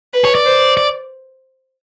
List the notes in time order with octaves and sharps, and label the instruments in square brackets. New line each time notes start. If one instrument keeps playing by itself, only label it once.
[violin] B4
[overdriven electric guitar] C#5
D5
[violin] C5
[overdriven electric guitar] D5